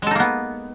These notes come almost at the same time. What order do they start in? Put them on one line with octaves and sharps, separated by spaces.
G#3 A4 D#4 A#3 B3